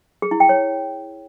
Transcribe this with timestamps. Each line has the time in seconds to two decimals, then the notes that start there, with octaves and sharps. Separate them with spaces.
0.22 G#4
0.31 E4
0.40 G5
0.49 C#5